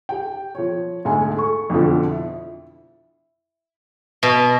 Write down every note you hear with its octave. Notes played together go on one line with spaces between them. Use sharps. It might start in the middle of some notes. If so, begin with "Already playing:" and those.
G4 G5
F3 C#5
D2 G#2 G#4 G#5
A4 C#6
F2 B2 D3 F3
E4
B2